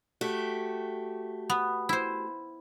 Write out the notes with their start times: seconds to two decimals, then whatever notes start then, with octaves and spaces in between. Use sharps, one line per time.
0.21 A3 F#4 G4
1.50 B3
1.89 E4 C5